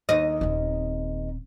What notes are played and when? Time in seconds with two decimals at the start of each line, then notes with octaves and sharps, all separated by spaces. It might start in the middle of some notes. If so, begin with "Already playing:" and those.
0.09 D#2 D#5
0.41 D#1 C4